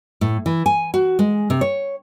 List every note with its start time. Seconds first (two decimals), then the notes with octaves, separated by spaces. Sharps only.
0.21 A2
0.46 E3
0.66 G#5
0.94 F#4
1.19 G#3
1.50 C3
1.61 C#5